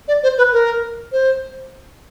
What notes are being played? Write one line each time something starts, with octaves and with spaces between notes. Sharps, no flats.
D5
C5
B4
A#4
C5